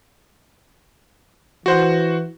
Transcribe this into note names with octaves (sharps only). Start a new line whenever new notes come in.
E3 F#4 C5 F#5